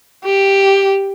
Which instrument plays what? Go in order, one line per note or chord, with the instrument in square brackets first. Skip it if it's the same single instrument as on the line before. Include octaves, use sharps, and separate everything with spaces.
[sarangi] G4